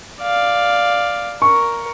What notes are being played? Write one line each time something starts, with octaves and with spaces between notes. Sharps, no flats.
D5 F5
A#4 C#6